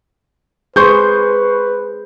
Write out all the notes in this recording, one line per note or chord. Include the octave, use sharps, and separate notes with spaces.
G#4 B4 C5 C6 C#6 G6